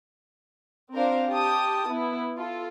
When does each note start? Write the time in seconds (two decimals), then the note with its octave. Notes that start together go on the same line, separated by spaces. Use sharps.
0.93 C4 D4 F4 A#4 C5 F5
1.29 G4 A5 D#6
1.88 B3 E4
2.35 F4 A4